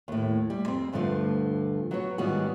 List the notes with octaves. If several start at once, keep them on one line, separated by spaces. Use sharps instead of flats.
D#2 A2
G3
F2 C4
D2 G2 D3 F3 A3
F#3 B3 C#5
G#2 D#3 G3 B3 F4 F#4